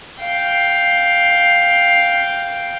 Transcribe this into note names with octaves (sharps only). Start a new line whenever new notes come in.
F5 G5